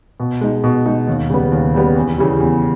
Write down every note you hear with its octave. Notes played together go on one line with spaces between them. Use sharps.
B2
G#3 D#4
B2
G#3 D#4
D#2
C#3 G3 B3
D#2
C#3 G3 B3
E2
C#3 E3 G3
E2